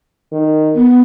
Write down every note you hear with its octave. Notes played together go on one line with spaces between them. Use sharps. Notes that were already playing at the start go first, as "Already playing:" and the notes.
D#3
B3